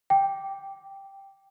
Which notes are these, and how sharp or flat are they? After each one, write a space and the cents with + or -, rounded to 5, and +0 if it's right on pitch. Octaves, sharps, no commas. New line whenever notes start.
G5 +0 D6 -5